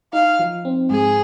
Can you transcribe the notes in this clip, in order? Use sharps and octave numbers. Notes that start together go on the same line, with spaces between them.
D#4 F5
F3
C4
G#2 G#4